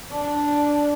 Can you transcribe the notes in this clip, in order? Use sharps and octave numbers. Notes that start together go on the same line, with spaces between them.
D4